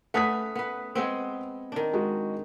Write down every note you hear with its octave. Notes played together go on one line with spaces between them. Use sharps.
A3 C#4 B4 F#5 D#6 B6
B3 B4
G#3 B3 C4
D#3 D4
G#3 F#4